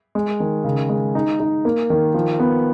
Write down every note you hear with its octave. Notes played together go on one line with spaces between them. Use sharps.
G#3
D#3
C#3
G#3
D#4
D#4
A#3
D#3
F3
B3